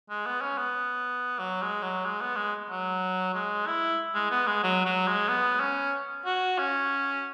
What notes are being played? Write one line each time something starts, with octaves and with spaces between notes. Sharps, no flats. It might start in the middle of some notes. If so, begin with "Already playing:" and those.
G#3
B3
C#4
B3
F#3
G#3
F#3
G#3
B3
G#3
F#3
G#3
E4
G#3
B3
G#3
F#3
F#3
G#3
B3
C#4
F#4
C#4